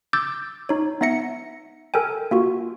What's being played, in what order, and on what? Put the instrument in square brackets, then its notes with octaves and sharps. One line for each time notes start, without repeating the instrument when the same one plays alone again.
[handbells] D6 E6 G6 A6
D#4 C#5
B3 D#4 E5 A#6 C#7
A4 A#4 G5 G#5
A#3 F4 F#4